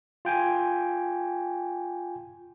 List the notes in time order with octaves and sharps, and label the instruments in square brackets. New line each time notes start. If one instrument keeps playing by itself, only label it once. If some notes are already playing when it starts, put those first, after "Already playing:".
[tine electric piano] F4 G5 G#5